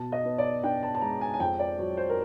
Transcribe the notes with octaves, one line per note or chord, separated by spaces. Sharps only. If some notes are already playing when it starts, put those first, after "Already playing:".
Already playing: B2 A5
D#5
B3
D5
D4 G5
A5
A5
G#3 A#5
G#5
G#5
F2 G5
D5
F#3 C#5
C5
A#4